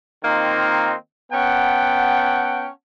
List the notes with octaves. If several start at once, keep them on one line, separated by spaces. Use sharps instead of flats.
D#3 A#3 C4 D#4 F4
B3 C#4 F#5 G5 A5